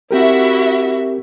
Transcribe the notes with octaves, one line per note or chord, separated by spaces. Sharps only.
C4 E4 F#4 G4 A#4 E5